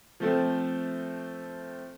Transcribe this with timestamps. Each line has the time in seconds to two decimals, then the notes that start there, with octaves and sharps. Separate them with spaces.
0.20 F3 A3 C4